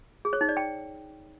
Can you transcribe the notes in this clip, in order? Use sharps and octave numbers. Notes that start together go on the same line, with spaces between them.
G#4
C#5
D#4
D5
G5